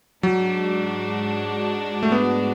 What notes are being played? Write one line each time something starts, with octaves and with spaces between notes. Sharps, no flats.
G#2 F#3 G#3 D4 F#4
A3
B3